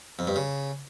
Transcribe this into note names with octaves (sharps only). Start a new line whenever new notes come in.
F2
G2
C#3